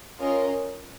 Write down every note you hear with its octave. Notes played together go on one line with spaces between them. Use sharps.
C#4 F4 A#4 D#5